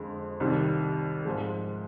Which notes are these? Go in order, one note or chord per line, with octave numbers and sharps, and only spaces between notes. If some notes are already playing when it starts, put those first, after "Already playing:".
Already playing: F2 D3 G#3
C2 C3 D#3 G3
G#2 F3 G#3